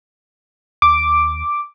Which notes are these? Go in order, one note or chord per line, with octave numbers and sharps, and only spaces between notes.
D#2 D6